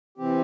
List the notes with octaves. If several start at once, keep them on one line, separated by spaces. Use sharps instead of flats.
C3 E3 C4 G4